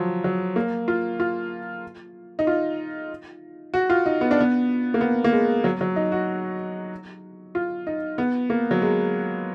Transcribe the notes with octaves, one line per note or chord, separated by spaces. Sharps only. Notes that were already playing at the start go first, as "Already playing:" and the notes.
Already playing: F3 F#3
F#3
A#3
F4
F4
D#4
F4
F#4
F4
D#4
B3
D4
B3
A#3
B3
A#3
G#3
F#3
F#3
D#4
F#4
F4
D#4
B3
A#3
F#3
G#3